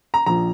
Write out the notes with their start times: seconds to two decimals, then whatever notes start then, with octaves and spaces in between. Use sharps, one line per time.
0.14 A#5
0.26 A#1 A#2 F3 A#5